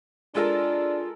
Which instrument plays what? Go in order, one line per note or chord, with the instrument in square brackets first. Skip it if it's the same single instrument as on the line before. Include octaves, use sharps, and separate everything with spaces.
[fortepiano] G#3 A4 A#4 [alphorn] D4 [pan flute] F4